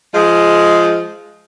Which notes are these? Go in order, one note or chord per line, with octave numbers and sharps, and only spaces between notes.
F3 G#3